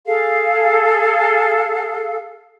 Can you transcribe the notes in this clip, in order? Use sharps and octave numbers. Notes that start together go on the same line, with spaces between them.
G#4 A4 F5